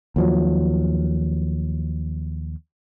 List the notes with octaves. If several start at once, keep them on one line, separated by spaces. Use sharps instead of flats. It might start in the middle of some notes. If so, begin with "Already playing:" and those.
D#2 F3 F#3